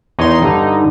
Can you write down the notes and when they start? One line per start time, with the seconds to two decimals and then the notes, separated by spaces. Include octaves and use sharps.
0.19 E2 D#4 C#5 C6
0.42 G2 D3 D#4